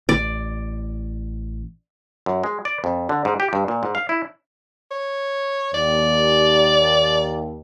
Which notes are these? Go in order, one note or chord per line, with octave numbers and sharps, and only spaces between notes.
A1 D5
F#2
G#3
D5
F2
D3
G#2
G4
G2
A#2
G#2
F5
E4
C#5
D#2 D5